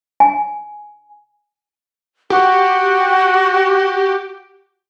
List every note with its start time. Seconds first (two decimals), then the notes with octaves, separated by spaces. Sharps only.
0.20 G#5
2.30 F#4 G4